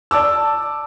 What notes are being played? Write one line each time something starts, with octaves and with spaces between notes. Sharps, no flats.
D5 A5 D6 E6